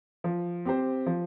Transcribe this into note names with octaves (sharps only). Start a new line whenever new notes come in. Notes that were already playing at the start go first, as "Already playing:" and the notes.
F3
C4 G4 C5
F3